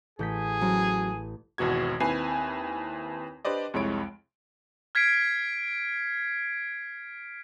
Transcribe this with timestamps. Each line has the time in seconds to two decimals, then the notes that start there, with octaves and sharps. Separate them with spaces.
0.19 A1 G#4 G6 B6
0.61 F#3 C#4 C5
1.58 G#1 E2 B2 F#4 G#6
2.00 D#2 C4 E4 B4 G#5 C7
3.45 D4 G4 B4 C5 D5 D#5
3.74 C2 F2 G#3 E4 C#5 D7
4.95 F6 G#6 B6 C7 D7